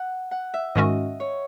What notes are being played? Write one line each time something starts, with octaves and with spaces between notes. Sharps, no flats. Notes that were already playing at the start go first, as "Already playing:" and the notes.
Already playing: F#5
F#5
E5
G#2 D#3 G#3 C#4 F#4 D#5
C#5